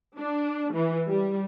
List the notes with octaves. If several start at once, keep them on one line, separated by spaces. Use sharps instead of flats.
D4
E3
G3